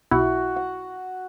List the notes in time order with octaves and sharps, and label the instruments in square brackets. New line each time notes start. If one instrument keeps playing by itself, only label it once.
[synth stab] B1 E4 [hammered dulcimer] F#4
[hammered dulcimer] F#5